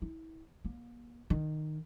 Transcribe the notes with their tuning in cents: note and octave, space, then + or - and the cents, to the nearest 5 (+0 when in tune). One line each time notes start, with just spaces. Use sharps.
E4 -35
A#3 +35
D#3 -15